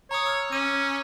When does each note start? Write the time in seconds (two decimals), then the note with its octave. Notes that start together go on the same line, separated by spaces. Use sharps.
0.11 C#5 A#5 D#6
0.26 E6 F6
0.52 C#4 D6 D#7